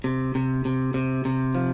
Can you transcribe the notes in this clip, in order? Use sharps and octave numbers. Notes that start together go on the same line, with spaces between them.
C3
C3
C3
C3
C3
F3